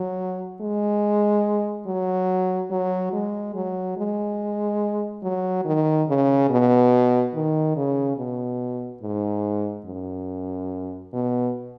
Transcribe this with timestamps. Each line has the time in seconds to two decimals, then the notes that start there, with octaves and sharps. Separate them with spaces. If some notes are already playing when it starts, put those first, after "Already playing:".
Already playing: F#3
0.61 G#3
1.86 F#3
2.71 F#3
3.13 G#3
3.55 F#3
3.97 G#3
5.23 F#3
5.65 D#3
6.08 C#3
6.50 B2
7.34 D#3
7.76 C#3
8.17 B2
9.02 G#2
9.86 F#2
11.13 B2